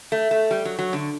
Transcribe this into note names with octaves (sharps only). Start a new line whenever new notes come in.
A3
A3
G3
F#3
F#3
D3